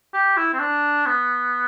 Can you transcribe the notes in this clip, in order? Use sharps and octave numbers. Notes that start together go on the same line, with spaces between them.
G4
E4
C4
D4
B3